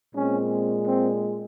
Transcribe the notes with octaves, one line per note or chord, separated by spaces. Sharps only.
A#2 G#3 C4 C#4
C4